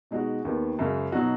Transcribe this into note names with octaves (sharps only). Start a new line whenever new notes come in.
B2 G#3 D#4 F#4
D#2 D#3 B3
F#2 C#3 G#3
B2 F#3 D#4 F#4